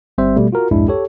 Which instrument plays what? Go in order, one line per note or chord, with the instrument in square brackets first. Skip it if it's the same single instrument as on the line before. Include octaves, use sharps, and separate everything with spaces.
[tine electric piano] G1 G3 C4 C5 E5
B2 G3 A3
F4 F#4 A#4
C2 F2 G#2 G#3 D4 E4
G4 A4 C#5